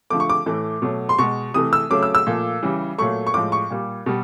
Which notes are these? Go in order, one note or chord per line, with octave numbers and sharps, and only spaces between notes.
D3 F3 A3 D6
C#6
D6
A2 E3 A3
B2 F#3 A3
C6
B2 G#3 C#6
C3 E3 A3 D#6
E6
C#3 F#3 A3 D6
E6
E6
A#2 F3 A3
C#3 E3 G3
A#2 F#3 A3 C#6
C#6
A2 F3 G#3 D6
C#6
A#2 G3
B2 G3